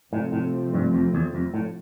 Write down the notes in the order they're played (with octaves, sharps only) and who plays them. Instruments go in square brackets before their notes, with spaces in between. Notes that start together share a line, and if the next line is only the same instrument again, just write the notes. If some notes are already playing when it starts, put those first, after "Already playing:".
[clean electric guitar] A2 [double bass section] C3 F3 A3 C4
[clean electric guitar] A2
G2
F2
E2
F2
A2